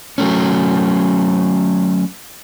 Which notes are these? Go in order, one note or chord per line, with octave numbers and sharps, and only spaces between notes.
F#3 A3 C#4